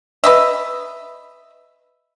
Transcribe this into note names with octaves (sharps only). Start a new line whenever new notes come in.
B4 D#5 E5